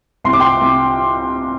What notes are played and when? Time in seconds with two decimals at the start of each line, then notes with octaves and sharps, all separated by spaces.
0.24 C2 C6
0.33 D6
0.40 G5 C6
0.61 C2